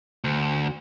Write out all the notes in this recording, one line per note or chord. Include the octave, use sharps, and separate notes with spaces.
D2